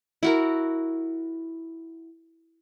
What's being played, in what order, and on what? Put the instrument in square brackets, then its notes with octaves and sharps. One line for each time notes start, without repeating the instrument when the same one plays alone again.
[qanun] E4 F#4 A#4